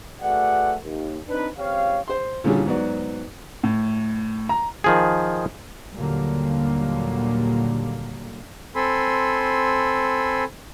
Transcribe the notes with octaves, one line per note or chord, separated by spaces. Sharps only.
A3 F#4 G#4 B4 D5 F#5
D#2
C4 D4 D#4 B4
C#2 C4 G4 C#5 F5
C5 C6
A#2 D3 E3 G3 C#4 G#4
G#2 F#3 B3 F#4 D5
A2
A#5
D#3 F3 G#4
D#2 A#2 D3 F#3 G3 A#3
C4 A4 G#5 B5 C6